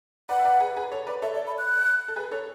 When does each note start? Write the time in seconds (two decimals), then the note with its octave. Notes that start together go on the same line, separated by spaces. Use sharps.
0.29 B4 D5 F#5
0.39 E5
0.45 B4 D5
0.60 G#4 B4
0.76 G#4 B4
0.92 A4 C#5
1.07 B4 D5
1.22 A4 C#5 E5
1.35 D5
1.47 B5
1.58 F#6
2.08 A4
2.16 G#4 B4
2.31 A4 C#5